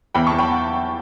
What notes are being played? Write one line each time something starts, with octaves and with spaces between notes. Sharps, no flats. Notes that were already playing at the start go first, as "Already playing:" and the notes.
E2 G5 B5
A5 C#6
E2
G5 B5
F#5 A5